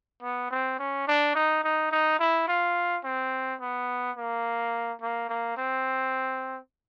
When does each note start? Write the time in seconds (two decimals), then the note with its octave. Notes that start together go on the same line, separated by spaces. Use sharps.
0.22 B3
0.51 C4
0.79 C#4
1.08 D4
1.35 D#4
1.64 D#4
1.91 D#4
2.19 E4
2.48 F4
3.04 C4
3.61 B3
4.17 A#3
5.01 A#3
5.29 A#3
5.57 C4